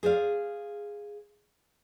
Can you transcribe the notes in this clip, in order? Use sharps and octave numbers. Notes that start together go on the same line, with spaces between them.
G#4 C5 D5 F5